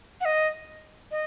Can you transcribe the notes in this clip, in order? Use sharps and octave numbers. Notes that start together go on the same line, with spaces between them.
F#5
D#5
D#5